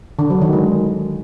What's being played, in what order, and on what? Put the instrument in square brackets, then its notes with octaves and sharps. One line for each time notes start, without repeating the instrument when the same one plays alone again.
[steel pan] D3
F#3
D#3
G#3